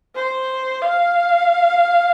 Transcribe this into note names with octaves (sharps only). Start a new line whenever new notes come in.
C5
F5